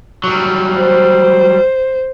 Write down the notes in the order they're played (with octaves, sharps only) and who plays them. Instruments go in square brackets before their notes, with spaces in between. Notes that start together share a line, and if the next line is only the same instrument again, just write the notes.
[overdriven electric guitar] F#3 G3
[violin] C5